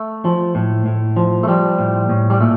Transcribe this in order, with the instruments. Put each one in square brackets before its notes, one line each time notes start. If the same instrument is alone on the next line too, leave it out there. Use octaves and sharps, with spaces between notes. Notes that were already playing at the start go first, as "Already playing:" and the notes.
Already playing: [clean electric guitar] A3
F3
A2
A2
F3
A3
F3 G3
A2
A2
G3
A#2 A3